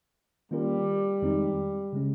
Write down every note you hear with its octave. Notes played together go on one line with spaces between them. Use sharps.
D#3 G3 A#3 C#4 F4 A#4
F2 D#3 G#3 C4 D#4
C#3 G#3 C#4